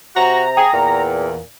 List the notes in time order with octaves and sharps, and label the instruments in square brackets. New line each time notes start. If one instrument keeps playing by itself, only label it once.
[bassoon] C3 [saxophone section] F#4 [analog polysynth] A#5
[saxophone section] G#4 [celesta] G5
[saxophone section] E2 [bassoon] A#2